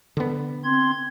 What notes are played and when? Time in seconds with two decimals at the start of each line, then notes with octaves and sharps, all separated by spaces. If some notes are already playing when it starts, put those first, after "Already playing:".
0.17 D3 B3
0.64 C4 C6 G#6